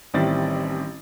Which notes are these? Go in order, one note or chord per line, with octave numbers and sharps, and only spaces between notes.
A1 D#3 G3 C4 E4 A6